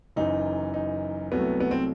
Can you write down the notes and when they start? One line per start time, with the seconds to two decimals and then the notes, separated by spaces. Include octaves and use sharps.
0.16 F#1 F#2 E3 D#4
0.74 D#4
1.32 C2 C3 F#3 A3 B3
1.60 B3
1.71 C4